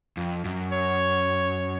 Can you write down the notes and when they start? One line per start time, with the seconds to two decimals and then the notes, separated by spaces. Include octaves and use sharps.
0.17 F2
0.45 F#2
0.73 C#5